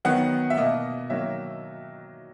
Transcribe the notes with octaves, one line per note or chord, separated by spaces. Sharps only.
D#3 F#3 B3 F#5
E5
B2 A#3 D#5
D#3 F#3 A#3 E5